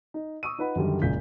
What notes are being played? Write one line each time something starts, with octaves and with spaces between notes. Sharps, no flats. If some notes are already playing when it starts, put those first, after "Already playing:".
D#4
C#6 D#6 E6 D#7
D#4 F4 B4 F#5 B5
F#2 D3 D#3 G3
F#1 A#2 C#3 G#3 G6 B6